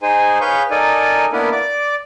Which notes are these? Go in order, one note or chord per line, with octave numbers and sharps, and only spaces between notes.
D#4 G#4 C5 G#5
G#4 B4 C#5 F5 C#6 G6
D#4 A4 A#4 D5 G#5
A#3 B3 D4 E4 A#4 B4
D5 D6